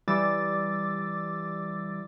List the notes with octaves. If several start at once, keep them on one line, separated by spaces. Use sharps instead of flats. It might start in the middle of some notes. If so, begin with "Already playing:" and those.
E3 G3 D6 E6 A6